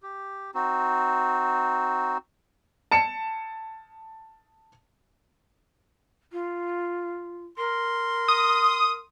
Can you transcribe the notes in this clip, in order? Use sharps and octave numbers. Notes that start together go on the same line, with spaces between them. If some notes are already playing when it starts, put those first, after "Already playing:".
G4
C4 D#4 F#4
A5 C#7 E7
F4
A#4 C6
D#6